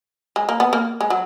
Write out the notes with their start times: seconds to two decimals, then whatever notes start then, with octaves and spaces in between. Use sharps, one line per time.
0.36 G#3
0.49 A#3
0.60 B3
0.73 A#3
1.01 G#3
1.10 F#3